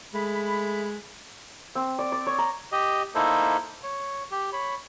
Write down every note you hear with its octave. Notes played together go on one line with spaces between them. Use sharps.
G#3 A3 G#4 B5
C4
D5
D5
C#5
A#5
G4 D#5
A#3 D#4 E4 A4 C5
C#5
G4
C#5 B5